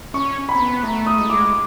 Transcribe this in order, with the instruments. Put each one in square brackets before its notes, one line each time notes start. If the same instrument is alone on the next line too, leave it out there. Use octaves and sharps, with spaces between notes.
[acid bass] C#4 [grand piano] C#6
[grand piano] B5
[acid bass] C4
B3
[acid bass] A3 [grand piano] A#5
[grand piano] D#6
[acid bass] G#3
A3
[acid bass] G#3 [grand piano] D6